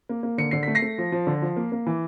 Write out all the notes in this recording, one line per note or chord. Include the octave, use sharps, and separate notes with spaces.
A#3
A#3
D3 C#7
D3 C7
A3 B6
A#6 C7
A3
F3
F3
D3
F3
A#3
A#3
E3